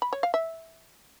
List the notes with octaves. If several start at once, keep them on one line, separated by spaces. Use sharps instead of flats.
B5
C#5
F5
E5